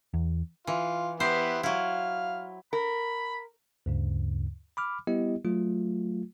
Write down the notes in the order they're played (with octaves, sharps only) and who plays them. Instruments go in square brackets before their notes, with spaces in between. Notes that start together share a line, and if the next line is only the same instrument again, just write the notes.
[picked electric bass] E2
[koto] E3 [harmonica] F4
[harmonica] B3 E4 [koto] G4 C5
[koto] F#3 E4 [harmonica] F5
[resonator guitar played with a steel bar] A#4 [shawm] B5
[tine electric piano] D2 G2 C#3
B5 D6 F6
G3 B3 E4 G4 D#5
F#3 A3 F4